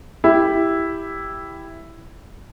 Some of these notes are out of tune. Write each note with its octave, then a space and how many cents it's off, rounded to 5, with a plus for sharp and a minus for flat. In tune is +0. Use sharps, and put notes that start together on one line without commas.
E4 +0 G4 +5